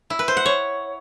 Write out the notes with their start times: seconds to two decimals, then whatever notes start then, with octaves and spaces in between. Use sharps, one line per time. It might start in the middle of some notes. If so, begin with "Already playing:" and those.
0.10 E4
0.19 B4
0.28 C5
0.37 F#5
0.46 C#5